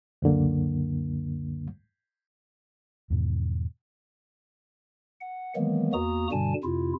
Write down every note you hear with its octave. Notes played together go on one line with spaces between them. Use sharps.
C#2 F#2 D3 A#3
E2 G#2 B2 D#3
F#5
D#3 E3 F#3 G#3 A#3 B3
E2 A#3 F#4 A#5 D#6
G2 B2 D3 G3 G#5 A5
F2 C3 E4 F4